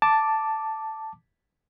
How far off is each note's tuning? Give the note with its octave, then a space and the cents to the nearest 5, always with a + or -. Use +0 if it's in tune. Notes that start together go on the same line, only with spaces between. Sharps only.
A5 +0 D6 +0